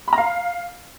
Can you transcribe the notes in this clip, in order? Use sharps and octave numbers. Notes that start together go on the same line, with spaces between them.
B5
A#5
F5